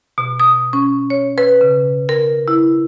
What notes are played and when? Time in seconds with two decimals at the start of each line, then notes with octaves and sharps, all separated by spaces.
0.18 B2
0.40 D#6
0.73 C#4
1.10 C#5
1.38 B4
1.61 C#3
2.09 A#4
2.48 E4